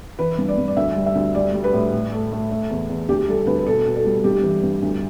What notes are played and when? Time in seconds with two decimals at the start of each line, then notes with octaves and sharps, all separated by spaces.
0.19 E3 B4
0.38 G2
0.49 D5
0.58 G2
0.68 D5
0.77 D2 E5
0.96 G3
1.06 E5
1.15 D2
1.35 G3 D5
1.54 G3
1.64 B4
1.73 A2
1.92 A2
2.12 A3
2.32 A3
2.50 A3
2.70 E2
2.89 E2
3.08 D2 G4
3.28 G3 A4
3.47 D2 B4
3.58 B4
3.66 B2 A4
3.86 B2
3.96 A4
4.05 G3
4.24 G2 G4
4.43 E3
4.63 G2
4.82 D2